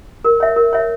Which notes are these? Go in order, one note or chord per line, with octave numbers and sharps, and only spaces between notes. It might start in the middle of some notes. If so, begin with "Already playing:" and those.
A#4
C#5 E5
A#4
C#5 E5